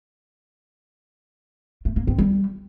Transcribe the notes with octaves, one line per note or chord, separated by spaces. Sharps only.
A3
A#3
C4
G3